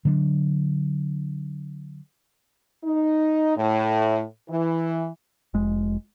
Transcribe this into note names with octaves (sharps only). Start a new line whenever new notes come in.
D3 F#3 B3 D4
D#4
A2
E3
F1 G#3